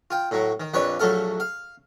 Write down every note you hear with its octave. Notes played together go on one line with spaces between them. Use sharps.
F4 G5
A2 F#3
D#3
A#1 F2 B4 C#5 D5
A#1 F#3 A3 A4 F5
F5